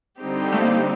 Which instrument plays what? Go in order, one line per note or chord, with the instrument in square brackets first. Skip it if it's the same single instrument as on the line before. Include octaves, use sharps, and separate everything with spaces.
[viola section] D3 G3 C4 D#4 G4
[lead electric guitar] A3
A#3